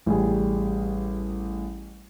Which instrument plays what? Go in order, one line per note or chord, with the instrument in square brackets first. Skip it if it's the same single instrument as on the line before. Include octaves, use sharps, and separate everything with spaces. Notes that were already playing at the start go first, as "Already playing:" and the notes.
[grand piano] A1 G3 G#4